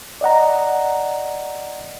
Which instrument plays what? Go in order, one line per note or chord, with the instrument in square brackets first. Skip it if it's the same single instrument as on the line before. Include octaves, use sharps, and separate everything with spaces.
[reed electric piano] D5 D#5 F#5 A#5